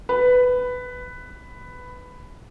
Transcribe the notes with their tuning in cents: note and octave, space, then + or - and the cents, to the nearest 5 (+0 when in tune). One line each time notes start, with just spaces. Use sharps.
B4 +10